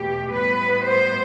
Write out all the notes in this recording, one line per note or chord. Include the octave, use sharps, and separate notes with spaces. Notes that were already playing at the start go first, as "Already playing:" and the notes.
Already playing: E2 B2 A3 G4
A2 G3 B3 B4
C5